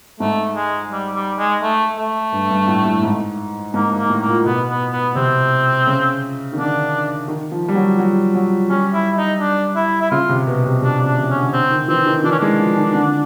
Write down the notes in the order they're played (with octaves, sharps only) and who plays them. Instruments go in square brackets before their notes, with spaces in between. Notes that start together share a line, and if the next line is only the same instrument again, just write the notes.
[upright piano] G#2 [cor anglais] A3
[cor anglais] G#3
G3
G3
G#3
A3
A3
[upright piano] G2
G2
A2
A2
G#2
[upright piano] G#2 [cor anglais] A#3
[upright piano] G#2
[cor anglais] A#3
[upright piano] A2
[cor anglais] A#3
[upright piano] A#2
[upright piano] B2 [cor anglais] B3
[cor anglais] B3
B3
[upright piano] C3 [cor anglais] C4
[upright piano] C#3
D#3
[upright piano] D3 [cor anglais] D4
[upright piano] D#3
F3
G3
F#3
F#3
F#3
[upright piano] G3 [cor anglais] C#4
[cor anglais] E4
D#4
D4
E4
E4
[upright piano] C#3 [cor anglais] F4
[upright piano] C3
B2
C3
[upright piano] C3 [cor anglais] D4
[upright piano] C#3
[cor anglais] D4
[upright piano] C3
[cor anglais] C#4
[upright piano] D3
[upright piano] D3 [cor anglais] C4
[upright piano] D#3
[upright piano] E3 [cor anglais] C4
[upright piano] D#3
[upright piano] E3 [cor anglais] D4
[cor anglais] C#4
[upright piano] G#3 [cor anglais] D4
[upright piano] F3
D#3
D3